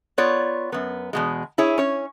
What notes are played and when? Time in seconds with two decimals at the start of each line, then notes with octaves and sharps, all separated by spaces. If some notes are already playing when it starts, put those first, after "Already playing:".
0.18 B3 F4 C#5 D5
0.72 F#2 B3
1.13 E2 B2 G#3
1.58 E4 G#4 C#5
1.78 C#4 C#5